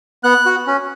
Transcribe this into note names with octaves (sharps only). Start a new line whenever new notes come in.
B3 F#6
F#4
C#4